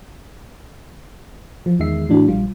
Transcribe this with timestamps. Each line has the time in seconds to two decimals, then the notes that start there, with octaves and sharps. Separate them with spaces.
1.66 F3
1.79 E2 D#3 G#3 E5 C7
2.09 A2 E3 D4 F#4
2.28 A#1 G3 F4